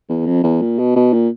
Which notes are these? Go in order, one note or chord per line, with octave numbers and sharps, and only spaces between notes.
E2
F2
E2
A#2
B2
B2
A#2